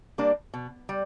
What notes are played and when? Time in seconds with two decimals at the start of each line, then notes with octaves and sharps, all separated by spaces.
0.18 G3 A#3 D4
0.54 B2
0.89 G3